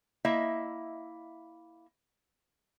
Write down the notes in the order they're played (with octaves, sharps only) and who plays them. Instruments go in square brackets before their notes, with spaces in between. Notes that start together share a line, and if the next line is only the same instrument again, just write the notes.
[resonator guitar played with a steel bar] A#3 E4 D#5 E5